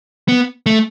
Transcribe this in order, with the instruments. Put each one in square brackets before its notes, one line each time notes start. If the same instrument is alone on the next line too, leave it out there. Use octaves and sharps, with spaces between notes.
[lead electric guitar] B3
A3